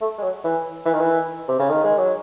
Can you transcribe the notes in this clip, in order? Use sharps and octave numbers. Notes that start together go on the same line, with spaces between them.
A3
G#3
F#3
E3
E3
D#3
E3
C3
C#3
D#3
G#3
F#3